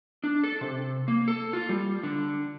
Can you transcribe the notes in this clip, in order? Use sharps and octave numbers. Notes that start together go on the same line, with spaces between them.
D4
A4
C3
A#3
A4
F4
G3
D3